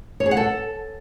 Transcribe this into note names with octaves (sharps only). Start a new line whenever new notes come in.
C#5
G#4
F#5
A4